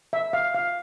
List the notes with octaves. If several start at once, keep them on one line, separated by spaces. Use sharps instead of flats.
E5
F5
F5